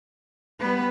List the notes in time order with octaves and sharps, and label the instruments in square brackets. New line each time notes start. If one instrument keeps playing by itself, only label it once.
[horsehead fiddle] G3 B4 [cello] B3